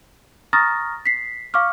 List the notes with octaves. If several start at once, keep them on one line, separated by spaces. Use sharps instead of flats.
A#5 C#6 D#6 F6 A6 A#6
B6 C7
F5 C#6 D6 F6